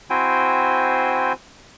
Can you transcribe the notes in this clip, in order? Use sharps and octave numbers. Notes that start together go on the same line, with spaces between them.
C4 E4 F#4 C5 G5 G#5